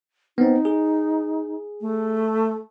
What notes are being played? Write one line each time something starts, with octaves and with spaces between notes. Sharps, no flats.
B3 C4 D#4
G#4
A3